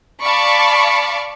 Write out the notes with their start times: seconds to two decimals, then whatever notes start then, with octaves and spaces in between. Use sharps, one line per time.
0.23 D5 F5 A5 B5 C#6 D6